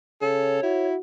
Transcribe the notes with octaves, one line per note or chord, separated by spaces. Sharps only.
C#3 A4 C#5
E4 F#4